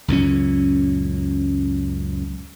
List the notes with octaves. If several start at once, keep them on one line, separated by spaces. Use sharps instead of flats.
C#2 F#2 A#2 C#4